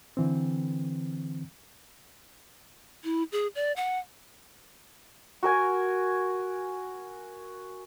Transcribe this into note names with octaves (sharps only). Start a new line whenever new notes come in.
D3 E3 C4
E4
G#4
D5
F#5
F#4 A#4 G#5